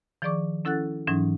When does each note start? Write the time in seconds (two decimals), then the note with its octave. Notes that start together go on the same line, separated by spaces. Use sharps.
0.22 D#3 F3 G#4 D5 C#6 D6
0.65 C#4 E4 A4 F#5 F#6 A6
1.07 G#2 E3 F#3 C#4 D#4